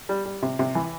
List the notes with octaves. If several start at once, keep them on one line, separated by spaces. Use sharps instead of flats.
G3
G3
C3
C3
E3